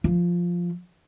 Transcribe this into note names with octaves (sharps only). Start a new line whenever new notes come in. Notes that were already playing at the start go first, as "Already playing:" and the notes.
F3